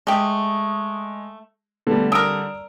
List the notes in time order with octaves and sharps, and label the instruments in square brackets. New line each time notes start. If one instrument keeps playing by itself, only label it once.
[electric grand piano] G#3 D#6 [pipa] A3 G4
[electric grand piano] D3 G3 [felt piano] A3 B3
[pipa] D4 A#4 [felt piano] D#6 E6 D7